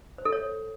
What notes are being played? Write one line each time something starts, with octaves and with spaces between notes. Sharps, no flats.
C5
A4
C#5